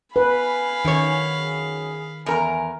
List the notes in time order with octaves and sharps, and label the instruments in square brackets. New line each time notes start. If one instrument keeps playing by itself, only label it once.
[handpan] B4 [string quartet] F5 B5 [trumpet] G#5
[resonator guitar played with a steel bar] F#2 C#5 [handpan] D#3
[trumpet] G#4
[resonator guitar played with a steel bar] E2 A#4 A#5 [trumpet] G#5